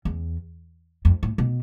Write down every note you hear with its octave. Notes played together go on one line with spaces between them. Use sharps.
E2
F2
A2
B2